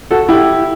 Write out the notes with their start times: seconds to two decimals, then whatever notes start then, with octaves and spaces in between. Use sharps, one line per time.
0.11 F#4 A4
0.29 E4 G4